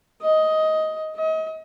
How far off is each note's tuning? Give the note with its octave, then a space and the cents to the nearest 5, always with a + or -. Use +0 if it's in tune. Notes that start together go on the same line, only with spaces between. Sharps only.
D#5 +10
D#5 +35